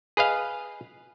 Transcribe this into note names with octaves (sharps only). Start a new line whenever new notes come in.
G#4 B4 D#5 F5